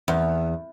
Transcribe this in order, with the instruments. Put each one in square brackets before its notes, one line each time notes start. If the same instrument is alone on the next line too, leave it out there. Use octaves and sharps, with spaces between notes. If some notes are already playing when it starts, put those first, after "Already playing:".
[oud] E2